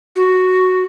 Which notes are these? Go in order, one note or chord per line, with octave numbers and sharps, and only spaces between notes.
F#4